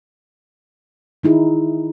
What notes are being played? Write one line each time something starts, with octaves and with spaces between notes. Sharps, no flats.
D#3 D#4 E4 G#4